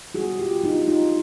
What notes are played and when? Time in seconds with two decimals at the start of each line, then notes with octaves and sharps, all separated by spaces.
0.14 B2 G3 B3 F#4 G#4
0.39 F4 G4
0.63 D3 F#3 B3 D4 D#4 F4
0.87 D#4 F4